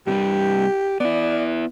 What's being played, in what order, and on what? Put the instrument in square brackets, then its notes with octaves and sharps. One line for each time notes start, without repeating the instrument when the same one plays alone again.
[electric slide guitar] G2 C3 G3 [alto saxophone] G4
[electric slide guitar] B3 E4 [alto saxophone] D5